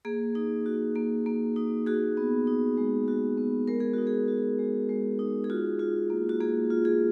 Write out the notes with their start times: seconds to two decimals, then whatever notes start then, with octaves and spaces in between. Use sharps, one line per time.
0.05 A#3 G#4
0.35 D#4
0.66 F#4
0.95 A#3
1.26 A#3
1.56 D#4
1.87 F#4 G#4
2.17 B3
2.47 D#4
2.77 G#3
3.08 F#4
3.37 B3
3.68 G#3 A#4
3.80 G#4
3.93 D#4 F#4
4.07 G#4
4.28 F#4
4.59 G#3
4.89 G#3
5.19 D#4
5.44 G#4
5.50 F4 F#4
5.79 F4
6.10 A#3
6.29 F#4
6.40 A#3 G#4
6.70 F4
6.85 G#4